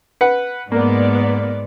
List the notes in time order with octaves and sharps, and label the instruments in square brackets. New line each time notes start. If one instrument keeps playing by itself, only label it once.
[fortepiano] B4 F#5
[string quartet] G#2 [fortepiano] A#3 [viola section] B3 D5